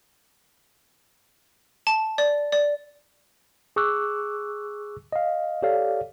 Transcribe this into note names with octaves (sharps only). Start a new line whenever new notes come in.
A5
D5
D5
G#4 C#6 D6 E6 F#6
D#5 F5
G4 A4 C#5 D5 F5